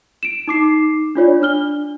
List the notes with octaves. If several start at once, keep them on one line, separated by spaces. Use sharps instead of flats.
D7 E7
D#4 D6 C7
D4 F4 C#5 D5
D4 F6 G7